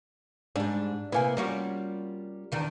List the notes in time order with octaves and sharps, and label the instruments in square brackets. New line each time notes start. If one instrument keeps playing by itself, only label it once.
[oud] G#2 G3 [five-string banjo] D4
[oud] C3 A#3 B3 [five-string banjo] E4 G#5
[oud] G3 C#4 F#4 [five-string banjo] A#3 F4
[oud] E2 D#3 D4